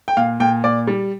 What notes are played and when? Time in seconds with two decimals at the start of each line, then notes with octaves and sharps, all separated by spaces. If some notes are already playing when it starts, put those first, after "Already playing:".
0.08 G5
0.17 A#2 F5
0.40 A#2 G5
0.64 A#2 D5
0.87 G3